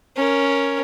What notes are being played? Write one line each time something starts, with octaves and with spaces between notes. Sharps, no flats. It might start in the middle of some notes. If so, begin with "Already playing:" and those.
C#4 A#4